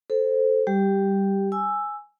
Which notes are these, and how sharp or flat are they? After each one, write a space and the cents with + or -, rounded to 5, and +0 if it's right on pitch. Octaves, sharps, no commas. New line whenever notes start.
A4 +0 C5 +0
G3 +0 G4 +0
G#5 +0 E6 +5